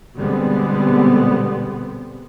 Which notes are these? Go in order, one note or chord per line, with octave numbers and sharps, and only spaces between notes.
B2 D3 G3 G#3 B3 C4